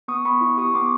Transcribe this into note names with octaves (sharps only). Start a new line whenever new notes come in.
B3 C#6 D#6
B3 B5 C#6
E4
G4 C#6 D#6
B3 C6 D6